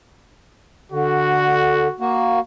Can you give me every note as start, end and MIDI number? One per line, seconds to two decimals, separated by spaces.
0.92 1.88 50
0.92 1.98 66
2.00 2.40 58
2.00 2.40 66